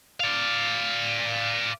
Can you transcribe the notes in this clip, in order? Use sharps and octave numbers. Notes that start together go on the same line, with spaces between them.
D5 F5